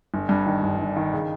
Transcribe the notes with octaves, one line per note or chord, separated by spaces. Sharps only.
G1
G2
D#3
G1
G1
D#3
C#3